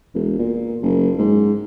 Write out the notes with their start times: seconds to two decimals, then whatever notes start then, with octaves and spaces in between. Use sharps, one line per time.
0.15 E1
0.39 A#2
0.82 F#1
1.18 G#2